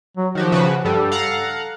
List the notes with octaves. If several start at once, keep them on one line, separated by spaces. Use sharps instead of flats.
F#3
D#3 F3 F#4 G4
C#3 F#4 B4
G2 G3 A4
F5 F#5 A#5